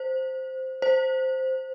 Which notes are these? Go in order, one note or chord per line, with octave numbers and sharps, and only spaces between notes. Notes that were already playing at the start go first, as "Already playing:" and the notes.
Already playing: C5
C5